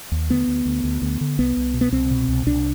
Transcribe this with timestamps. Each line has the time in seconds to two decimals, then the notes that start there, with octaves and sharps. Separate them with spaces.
0.12 D#2
0.30 D2 B3
0.48 D2
0.66 D2
0.84 D2
1.02 D2
1.21 D3
1.39 C2 B3
1.57 C2
1.74 B2
1.81 B3
1.92 C2 C4
2.11 B2
2.28 C2
2.46 C2 D4